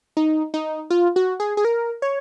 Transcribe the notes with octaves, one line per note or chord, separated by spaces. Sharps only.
D#4
D#4
F4
F#4
G#4
G#4
A#4
C#5